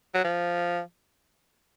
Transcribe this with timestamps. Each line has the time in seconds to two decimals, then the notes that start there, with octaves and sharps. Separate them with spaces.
0.14 F#3
0.24 F3